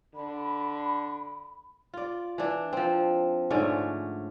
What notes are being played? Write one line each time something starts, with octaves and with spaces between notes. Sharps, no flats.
D3 B5
F4 D5
E3 D4
F3 C4
G#2 D3 A3 C#4